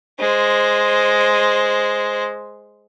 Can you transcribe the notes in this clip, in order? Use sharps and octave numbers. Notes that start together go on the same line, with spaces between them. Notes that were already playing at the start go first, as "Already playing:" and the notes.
G#3 C5